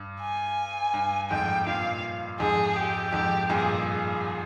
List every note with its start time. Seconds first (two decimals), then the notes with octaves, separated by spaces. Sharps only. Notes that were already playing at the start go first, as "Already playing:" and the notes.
Already playing: G2
0.21 G#5
0.94 G2
1.30 F2 G#2 G5
1.66 G2 A#2 F5
2.40 F2 G#2 G#4
2.76 G4
3.13 F2 G#2 G4
3.49 G2 A#2 G#4
3.86 G#4